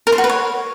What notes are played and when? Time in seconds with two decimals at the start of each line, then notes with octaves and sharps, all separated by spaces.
0.07 A#4
0.12 C5
0.18 F#4
0.24 B4
0.30 C#5